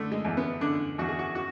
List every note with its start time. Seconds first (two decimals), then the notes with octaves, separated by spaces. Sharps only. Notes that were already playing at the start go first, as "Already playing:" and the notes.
Already playing: D3 A3
0.12 G#3
0.25 E2
0.37 B3
0.61 D3 D4
0.98 E2 F#4
1.08 G#4
1.19 F#4
1.35 F#4